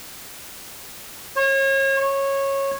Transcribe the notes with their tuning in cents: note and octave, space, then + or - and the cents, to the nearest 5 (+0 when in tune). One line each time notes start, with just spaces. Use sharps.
C#5 -35
C#5 -15